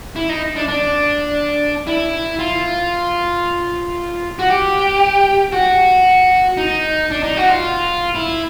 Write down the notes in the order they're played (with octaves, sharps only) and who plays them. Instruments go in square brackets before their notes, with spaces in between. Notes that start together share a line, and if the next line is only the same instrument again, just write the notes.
[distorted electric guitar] E4
D#4
D4
D4
E4
F4
F#4
G4
F#4
D#4
D4
D#4
F#4
F4
E4